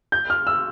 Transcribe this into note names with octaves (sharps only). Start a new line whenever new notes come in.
G6
F6
E6